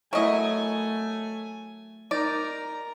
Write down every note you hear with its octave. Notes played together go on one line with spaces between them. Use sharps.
F#3 A3 E4 A#4 D#5 G#5
D#4 A#4 D5 A#5